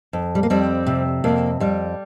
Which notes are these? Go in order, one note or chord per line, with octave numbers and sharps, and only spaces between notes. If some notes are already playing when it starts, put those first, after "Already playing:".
F2
G3
A#3
F2 G3 C4
C3
F2 A#3
F2 G3